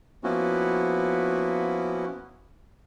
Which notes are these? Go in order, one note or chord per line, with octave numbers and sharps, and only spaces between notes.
F3 A#3 B3 C#4 E4 F#4